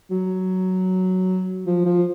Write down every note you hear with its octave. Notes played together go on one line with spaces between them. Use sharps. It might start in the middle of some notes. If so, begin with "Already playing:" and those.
F#3
F3
F3